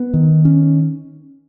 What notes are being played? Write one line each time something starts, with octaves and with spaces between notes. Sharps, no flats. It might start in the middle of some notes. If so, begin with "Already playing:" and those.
Already playing: B3
D#3
C#4